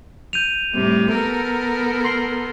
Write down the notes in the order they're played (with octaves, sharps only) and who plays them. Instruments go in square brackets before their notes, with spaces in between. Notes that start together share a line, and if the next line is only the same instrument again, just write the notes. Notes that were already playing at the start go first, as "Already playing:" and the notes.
[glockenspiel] G6 D#7 F7
[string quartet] A2 C3 G3
B3 A4 A#4
[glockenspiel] C6 C7 G7